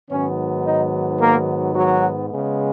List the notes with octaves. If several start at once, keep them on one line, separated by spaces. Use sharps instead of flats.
G#2 D#3 F#3 B3 C#4
D#4
A#3 A#4
F#3 F#4
C#3 G#3 B3